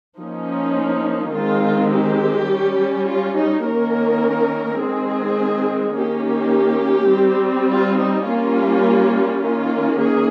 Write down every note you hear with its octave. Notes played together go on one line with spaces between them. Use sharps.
F3 A#3 C#4 D#4
D#3 G#3 C4 F4
G4
G3 C#4
F4
D#4
D#3 A#3 C#4 A#4
D#3 G#3 C4 G#4
D#3 A#3 C#4 G4
G4
G3 C4
F4
D#4
G3 A#3 C#4 F4
D#3 A#3 C#4 F4
G#4